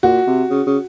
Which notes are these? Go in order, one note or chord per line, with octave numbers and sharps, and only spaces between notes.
A#2 F#4
C3
C#3
C#3